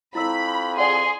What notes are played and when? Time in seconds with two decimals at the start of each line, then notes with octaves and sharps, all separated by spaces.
0.15 F2 E4 A#5 B5 E6
0.78 G#4 D5 F#5 C6